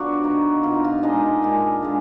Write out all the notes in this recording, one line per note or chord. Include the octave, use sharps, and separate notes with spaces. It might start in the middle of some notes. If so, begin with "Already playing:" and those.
Already playing: D3 F3 F#3 B3 D4 F#4 D5
B2 A#3 D4 D#4
B2 A#3 D4 F4
D#4
F4
A#2 G#3 D4 D#4 D#5
A#2 G#3 D4
D3 G#3